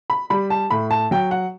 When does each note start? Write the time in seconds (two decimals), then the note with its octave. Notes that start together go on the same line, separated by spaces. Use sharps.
0.10 B5
0.30 G3 B5
0.50 A5
0.70 A2 B5
0.91 A5
1.11 F#3 G5
1.31 F#5